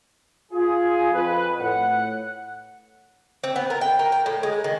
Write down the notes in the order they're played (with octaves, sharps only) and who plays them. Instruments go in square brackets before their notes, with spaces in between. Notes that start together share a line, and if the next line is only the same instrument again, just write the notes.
[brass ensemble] F4 G#4
F2 B4
A2 F#5
[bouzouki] C4
B3
A#4
G5
A#4
G5
A2
G#3
D#3